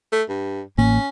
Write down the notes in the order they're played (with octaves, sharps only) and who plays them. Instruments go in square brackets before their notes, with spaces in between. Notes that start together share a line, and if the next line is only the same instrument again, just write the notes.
[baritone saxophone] A3
G2
[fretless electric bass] A1 A2 A#3 [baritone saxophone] C#4